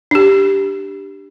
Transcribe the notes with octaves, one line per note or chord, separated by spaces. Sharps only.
D4 G4